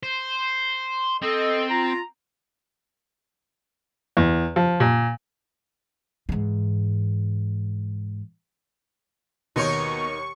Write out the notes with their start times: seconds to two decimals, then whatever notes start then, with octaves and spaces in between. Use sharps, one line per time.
0.03 C5
1.22 C4 A4 D#5
1.69 F4 A#5
4.17 E2
4.56 F3
4.80 A#2
6.29 G#2 E3
9.56 D#2 B2 D#4 A#4 C#5 C#6